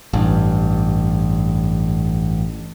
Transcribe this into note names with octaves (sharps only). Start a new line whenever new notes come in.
A1 G2